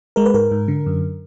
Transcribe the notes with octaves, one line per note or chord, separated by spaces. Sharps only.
G#3 A#4
B4
G#2 A#4
G#2
D3
F#2